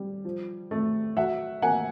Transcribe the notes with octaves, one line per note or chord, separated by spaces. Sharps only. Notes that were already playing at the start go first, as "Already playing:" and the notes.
Already playing: G3
F3
A3
F#3 E5 F#5
A#3 F#5 G#5